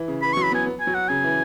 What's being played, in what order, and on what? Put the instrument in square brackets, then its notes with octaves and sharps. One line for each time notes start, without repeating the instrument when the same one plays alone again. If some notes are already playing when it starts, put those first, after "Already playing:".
Already playing: [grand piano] E3
C#3
[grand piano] E3 [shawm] B5
[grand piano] F#3 [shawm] C#6
[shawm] B5
[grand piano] B3
[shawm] G#5
[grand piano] B3
[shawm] G#5
[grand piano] F#3
[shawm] F#5
[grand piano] C#3 [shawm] G#5
[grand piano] E3